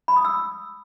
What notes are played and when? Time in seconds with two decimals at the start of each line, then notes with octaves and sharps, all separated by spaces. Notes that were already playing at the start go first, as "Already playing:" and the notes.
0.08 B5
0.16 D#6
0.25 E6